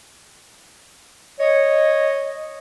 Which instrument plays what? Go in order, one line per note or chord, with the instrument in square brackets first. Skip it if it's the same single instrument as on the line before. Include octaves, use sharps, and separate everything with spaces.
[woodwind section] C#5 D#5